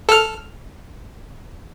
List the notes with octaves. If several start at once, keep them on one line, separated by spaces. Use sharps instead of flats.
A4 F6